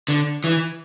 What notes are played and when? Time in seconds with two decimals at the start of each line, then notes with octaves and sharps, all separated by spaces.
0.08 D3
0.44 E3